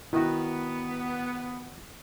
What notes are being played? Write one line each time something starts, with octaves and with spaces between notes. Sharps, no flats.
D#3 B3 E4 F#4